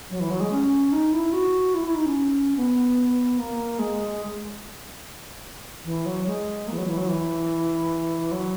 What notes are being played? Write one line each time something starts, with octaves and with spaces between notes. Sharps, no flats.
F#3
E3
F#3
G#3
C#4
D#4
E4
F#4
E4
E4
D#4
C#4
B3
A#3
G#3
E3
F#3
G#3
A#3
E3
F#3
E3
F#3
E3
F#3